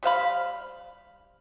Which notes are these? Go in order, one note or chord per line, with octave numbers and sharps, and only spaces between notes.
G3 C5 F5 B5